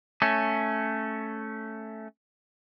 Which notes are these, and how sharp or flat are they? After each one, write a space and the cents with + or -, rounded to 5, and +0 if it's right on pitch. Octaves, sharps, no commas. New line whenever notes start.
A3 +0 C#4 +0